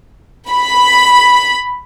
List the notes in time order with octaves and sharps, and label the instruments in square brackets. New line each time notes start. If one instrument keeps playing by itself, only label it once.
[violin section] B5